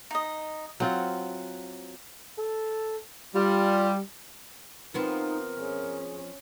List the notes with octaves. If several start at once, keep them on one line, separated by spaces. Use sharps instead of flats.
D#4 D#5
F#3 C4 F4 F#5
A4
G3 F4
F3 B3 C4 D#4 A#4
C#4 G#4